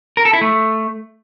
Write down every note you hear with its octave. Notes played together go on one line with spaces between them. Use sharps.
A#4
A4
E4
A3